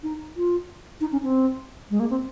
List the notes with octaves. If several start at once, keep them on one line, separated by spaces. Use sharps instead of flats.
D#4
F4
D#4
C#4
C4
G#3
A#3
C4